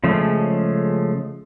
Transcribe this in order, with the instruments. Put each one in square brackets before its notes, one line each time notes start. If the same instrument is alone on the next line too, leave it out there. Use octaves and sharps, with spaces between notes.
[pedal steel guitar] C#3 F3 G#3 A3 C#4